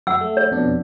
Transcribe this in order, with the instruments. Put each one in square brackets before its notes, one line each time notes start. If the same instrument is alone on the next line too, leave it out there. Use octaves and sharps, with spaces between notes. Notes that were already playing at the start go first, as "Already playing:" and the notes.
[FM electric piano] F#2 [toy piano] F#5 E6
[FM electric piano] A3
[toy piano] C#5
[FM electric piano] F2 B2 D4